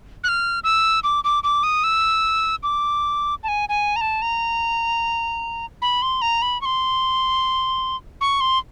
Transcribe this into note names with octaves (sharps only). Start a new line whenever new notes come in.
F#6
F6
E6
D6
D6
D6
D#6
E6
D6
A5
G#5
G#5
A#5
A5
A#5
B5
C6
A#5
B5
C#6
C6
C#6
C6